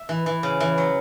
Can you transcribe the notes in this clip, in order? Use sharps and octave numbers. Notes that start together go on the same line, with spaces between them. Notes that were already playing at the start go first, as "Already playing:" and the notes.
Already playing: E5
E3
E3
C#3
E3
F#3